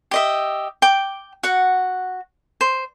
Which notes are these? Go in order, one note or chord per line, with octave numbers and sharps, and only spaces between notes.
G4 D#5 E5
G5 D6
F#4 F#5
C5